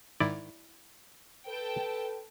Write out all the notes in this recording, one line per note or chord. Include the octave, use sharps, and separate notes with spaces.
G#2 D#3 E4 D5
A4 B4 G5 A5